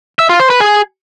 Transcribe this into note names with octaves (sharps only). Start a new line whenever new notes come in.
E5
F4
C5
B4
G#4